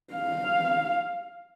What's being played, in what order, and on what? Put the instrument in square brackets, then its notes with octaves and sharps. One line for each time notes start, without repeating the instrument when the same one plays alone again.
[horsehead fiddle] F5